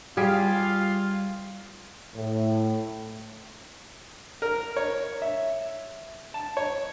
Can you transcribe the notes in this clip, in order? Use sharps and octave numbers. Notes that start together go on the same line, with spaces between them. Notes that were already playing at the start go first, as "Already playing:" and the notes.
G3 F4 G#4 F5
A2
A#4
C#5
E5
A5
C#5